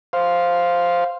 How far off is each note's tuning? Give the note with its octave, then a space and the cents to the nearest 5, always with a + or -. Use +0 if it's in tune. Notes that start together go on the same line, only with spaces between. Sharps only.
C5 +0 F5 +0